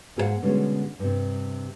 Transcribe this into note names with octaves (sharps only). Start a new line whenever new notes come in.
G#2 A#3 G#4 A#4 F5 F#5
B2 D3 G3 G#3 C#4
G2 C3